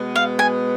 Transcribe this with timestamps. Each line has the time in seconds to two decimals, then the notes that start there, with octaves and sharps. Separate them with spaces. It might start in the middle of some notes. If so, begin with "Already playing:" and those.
Already playing: B2 G#3 B3
0.15 F5
0.39 G#5